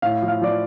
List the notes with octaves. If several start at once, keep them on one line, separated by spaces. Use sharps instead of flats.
A2 F5
F3
F5
F3 D5